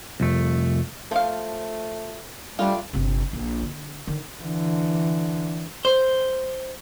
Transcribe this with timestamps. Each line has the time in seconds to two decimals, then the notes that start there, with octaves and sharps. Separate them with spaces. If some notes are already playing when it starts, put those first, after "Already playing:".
0.20 C2 F2 A3
1.11 F3 A3 F5
2.59 G3 A3 D4 F4
2.93 G1 C3
3.33 A#1
3.62 D3
4.07 D3 D#3
4.41 D3 E3
5.85 C5